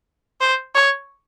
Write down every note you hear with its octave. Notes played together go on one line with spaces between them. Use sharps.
C5
C#5